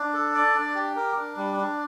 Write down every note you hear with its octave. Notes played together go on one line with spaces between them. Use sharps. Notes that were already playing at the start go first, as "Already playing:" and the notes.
Already playing: D4
A4
D5
D4
G4
A#4
D4
G3
D4